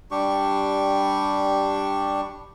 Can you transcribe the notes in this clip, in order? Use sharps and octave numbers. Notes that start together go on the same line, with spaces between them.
G3 D4 G4 C#6